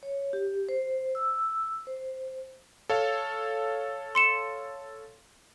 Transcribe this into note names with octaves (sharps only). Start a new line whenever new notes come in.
C#5
G4
C5
E6
C5
A4 C#5 F5
C6 C#7 E7